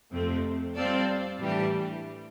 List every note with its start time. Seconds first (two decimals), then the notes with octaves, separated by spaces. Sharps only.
0.11 F2 C3 F3 A3 C4
0.75 G3 C4 F4 A4 D5
1.39 A2 E3 G3 D4 G4